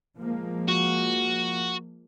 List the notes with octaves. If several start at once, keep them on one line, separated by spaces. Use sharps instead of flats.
F3 G#3 A#3
F#4